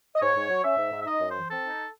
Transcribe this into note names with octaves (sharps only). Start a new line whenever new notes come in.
D#5
G#2 C#5
G#2
F#3
C#4 E5
G#2
G#2
E5
D#4 D#5
F#2
C5
E3
C4 A4
D#4